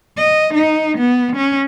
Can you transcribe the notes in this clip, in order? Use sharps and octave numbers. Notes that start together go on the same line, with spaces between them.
D#5
D#4
B3
C#4